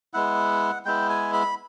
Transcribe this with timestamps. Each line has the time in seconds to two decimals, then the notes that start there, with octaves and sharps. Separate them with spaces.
0.14 G#3 B3 E4 F#5
0.85 G#3 B3 E4 G5
1.10 G#5
1.33 B5